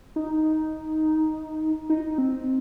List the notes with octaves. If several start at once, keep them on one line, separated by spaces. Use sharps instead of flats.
D#4
D#4
C4